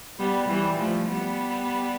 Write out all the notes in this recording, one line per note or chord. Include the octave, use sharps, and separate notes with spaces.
G3 B3
E3 G3
F3 A3
G3 B3